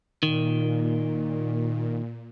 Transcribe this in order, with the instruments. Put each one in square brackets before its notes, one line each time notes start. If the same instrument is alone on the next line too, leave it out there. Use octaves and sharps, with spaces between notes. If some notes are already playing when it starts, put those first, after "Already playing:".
[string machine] A#2 [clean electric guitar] D#3